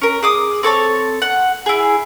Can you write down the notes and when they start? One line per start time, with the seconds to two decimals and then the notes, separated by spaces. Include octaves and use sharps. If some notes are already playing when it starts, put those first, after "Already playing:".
0.02 C#4 A#4
0.23 G#4 D6 D#6
0.63 C4 A4 C#5 A5
1.22 F#5
1.66 E4 G#4